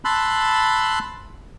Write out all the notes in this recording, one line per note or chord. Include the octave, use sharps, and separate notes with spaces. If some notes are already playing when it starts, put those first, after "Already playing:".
A5 B5 C6 E6 F#6